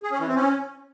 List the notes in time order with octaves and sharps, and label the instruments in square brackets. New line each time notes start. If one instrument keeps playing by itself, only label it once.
[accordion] G#4
C#4
E3
C4
C#4